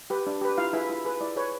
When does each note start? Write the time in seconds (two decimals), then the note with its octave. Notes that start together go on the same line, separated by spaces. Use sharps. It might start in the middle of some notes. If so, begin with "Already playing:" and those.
0.10 G4 B4
0.27 D4
0.41 G4 B4
0.58 E4 F4 F5
0.73 E4 G#4 B4 E5
0.89 E4
1.05 G#4 B4
1.21 E4 D5
1.36 G#4 B4 C#5